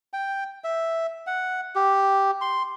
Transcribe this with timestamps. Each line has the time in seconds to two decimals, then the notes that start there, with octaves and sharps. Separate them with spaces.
0.13 G5
0.64 E5
1.27 F#5
1.75 G4
2.41 C6